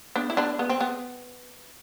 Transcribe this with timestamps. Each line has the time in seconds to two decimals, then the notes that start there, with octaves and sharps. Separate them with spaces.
0.16 B3 D4
0.30 E4
0.37 B3 D4
0.59 B3
0.70 C4
0.81 B3